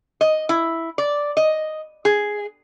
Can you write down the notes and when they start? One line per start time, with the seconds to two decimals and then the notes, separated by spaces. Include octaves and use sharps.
0.21 D#5
0.49 E4
0.98 D5
1.37 D#5
2.05 G#4